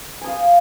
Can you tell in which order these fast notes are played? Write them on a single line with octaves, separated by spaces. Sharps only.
G#5 D#6 F5